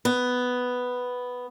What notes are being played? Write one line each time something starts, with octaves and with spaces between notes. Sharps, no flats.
B3